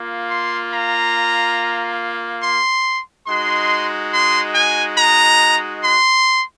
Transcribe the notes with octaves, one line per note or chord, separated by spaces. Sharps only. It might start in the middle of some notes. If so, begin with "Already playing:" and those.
Already playing: A#3 F4
C6
A#5
C6
G#3 D#4 F#4 C6
C6
G#5
A#5
C6